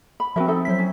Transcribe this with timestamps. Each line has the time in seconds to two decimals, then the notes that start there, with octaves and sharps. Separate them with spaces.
0.20 B5
0.36 F3 C4 F#4 A#4 E5
0.48 D#4 A4 E5
0.65 F#3 E4 C5 B6
0.79 C#4